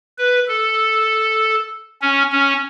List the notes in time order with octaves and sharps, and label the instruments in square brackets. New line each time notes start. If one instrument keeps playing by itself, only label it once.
[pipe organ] B4
A4
C#4
C#4